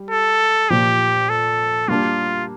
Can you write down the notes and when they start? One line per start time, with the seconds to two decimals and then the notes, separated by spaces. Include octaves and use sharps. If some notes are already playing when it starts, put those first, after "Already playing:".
Already playing: G3
0.11 A4
0.70 A#2 F3 A#3 G4
1.29 A4
1.88 G3 A#3 D4 F4